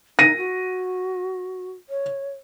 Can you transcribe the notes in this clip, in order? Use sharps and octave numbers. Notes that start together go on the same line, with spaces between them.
D#4 A#6 D#7
F#4
C#5